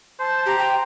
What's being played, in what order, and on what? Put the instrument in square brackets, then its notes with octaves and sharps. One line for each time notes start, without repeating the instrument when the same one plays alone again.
[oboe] C5 [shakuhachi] A5
[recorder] G4 [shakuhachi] A#5
[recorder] G5